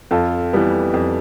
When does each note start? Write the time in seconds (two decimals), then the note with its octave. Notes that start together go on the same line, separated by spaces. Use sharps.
0.11 F2 F4 A4
0.53 E3 G3 B3
0.94 F2